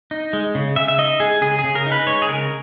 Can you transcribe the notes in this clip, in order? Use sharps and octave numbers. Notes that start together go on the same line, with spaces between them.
D#4
G#3
C#3
C#3 E5
E5
D#4 D#5
G#3 G#4
C#3 G#4
G#4
C#3
A#4
D#4
B4
G#3 C#5
G#4
C#3 A#4